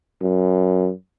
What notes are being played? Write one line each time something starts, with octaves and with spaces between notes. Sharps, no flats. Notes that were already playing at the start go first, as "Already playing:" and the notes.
F#2